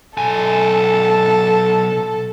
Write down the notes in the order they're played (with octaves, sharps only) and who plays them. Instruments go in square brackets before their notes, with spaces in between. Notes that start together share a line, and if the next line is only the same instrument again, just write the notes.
[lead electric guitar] B1 G#5 [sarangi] A4